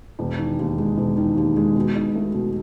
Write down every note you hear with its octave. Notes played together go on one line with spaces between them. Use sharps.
E1
D#3
D#2
G#3
E1
D#3
D#2
G#3
B2
D#4
A3
B2